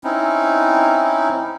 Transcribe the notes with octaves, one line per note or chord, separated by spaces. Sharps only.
C4 C#4 D#4 E4